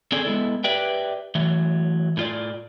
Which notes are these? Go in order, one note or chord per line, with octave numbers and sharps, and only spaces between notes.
D3 C4 C#4 G#4 A4 D5
G#3 B3 E4 A4
G4 B4 D5 E5 G5
E3 F#3 A3
A2 F4 D5